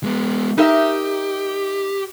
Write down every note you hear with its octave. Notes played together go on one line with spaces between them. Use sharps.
G#3 B3
D#4 G4 A#4 E5